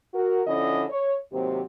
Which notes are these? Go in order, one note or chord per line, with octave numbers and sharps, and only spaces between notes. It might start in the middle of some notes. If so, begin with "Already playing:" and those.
F#4 A#4
D3 F3 C#4 E4 A4 D#5
C#5
D#2 C3 F#3 C4 G4 C5